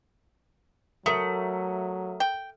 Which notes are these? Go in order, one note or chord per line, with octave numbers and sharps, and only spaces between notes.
F#3 A3 A#4 D#6
G5